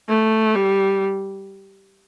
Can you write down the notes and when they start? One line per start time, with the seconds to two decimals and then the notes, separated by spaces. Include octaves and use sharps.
0.09 A3
0.55 G3